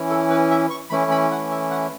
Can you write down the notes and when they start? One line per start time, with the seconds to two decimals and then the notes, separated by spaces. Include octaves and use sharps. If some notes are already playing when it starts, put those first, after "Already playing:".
Already playing: E3 C#4 E4
0.10 A4
0.30 B4
0.51 E5
0.70 C#6
0.90 E3 A3 C#4 E4 B5
1.11 B5
1.31 F#5
1.51 E5
1.71 F#5